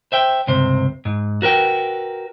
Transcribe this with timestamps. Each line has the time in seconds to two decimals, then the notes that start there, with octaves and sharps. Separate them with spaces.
0.12 C5 E5 G5
0.47 C#2 G2 C3 C5
1.05 G#2
1.42 F#4 A#4 B4 G5